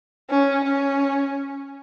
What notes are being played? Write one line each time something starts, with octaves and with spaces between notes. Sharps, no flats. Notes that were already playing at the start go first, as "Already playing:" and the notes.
C#4
C#4